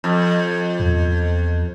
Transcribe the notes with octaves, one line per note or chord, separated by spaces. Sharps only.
F2
E2